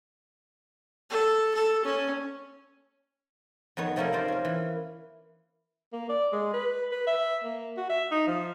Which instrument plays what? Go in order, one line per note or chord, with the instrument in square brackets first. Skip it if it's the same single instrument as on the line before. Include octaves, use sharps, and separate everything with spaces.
[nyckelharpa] A4
A4
C#4
[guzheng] F2 D#3 B3 C#5
C3 F3 A3 A#3 C#4 D#4
F4 A#4 C5 D5
C#4 A#4
E3
[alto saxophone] A#3
D5
G#3
B4
B4
E5
A#3
F#4
E5
D#4
F3